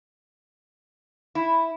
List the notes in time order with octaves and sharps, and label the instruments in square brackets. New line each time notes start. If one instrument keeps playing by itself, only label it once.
[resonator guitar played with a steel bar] E4